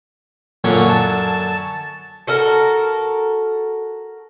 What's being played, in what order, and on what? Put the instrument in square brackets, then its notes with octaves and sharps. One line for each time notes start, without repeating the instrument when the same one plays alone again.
[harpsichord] F#2 D3 C#4 [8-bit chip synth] A#2
[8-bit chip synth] A5
[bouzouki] F#4 A4 A#4